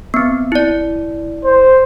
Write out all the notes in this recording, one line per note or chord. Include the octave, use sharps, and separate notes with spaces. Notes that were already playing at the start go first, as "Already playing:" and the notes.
B3 C4
E4 D5
C5